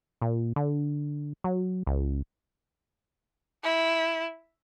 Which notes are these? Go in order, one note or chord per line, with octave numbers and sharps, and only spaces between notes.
A#2
D3
F#3
C#2
E4